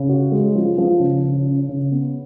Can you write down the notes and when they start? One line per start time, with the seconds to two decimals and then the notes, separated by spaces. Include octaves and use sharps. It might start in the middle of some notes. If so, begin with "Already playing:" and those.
Already playing: C#3
0.09 F#4
0.32 G#3
0.56 F3
0.78 F3
1.00 C#3
1.24 C#3
1.46 C#4
1.69 C#3
1.91 B3